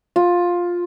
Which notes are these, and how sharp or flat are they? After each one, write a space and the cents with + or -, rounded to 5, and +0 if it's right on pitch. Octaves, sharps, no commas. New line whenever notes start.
F4 +10